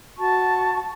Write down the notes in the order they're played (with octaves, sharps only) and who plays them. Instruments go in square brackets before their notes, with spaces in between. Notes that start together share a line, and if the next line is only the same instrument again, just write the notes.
[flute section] F#4 A5 C#6